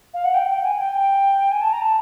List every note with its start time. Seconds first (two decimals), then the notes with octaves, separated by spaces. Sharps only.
0.13 F5
0.24 F#5
0.33 G5
0.43 F#5
0.48 G5
0.63 G#5
0.78 G5
1.51 G#5
1.61 A5
1.71 A#5
1.81 A5